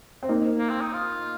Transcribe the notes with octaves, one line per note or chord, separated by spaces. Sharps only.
C4
A#3 D#4
A#3
C4
D#4
F4